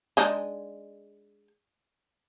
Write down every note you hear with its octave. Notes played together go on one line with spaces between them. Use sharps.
G#3 D4 D#4